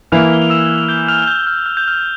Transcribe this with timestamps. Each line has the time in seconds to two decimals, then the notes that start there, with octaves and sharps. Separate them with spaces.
0.12 E3 A#3 E4 F6 F7
0.33 G7
0.42 F7
0.50 E6 E7
0.78 F7
0.89 G6 G7
1.08 F6 F7
1.27 G6
1.47 F6
1.66 F6
1.77 G6
1.88 F6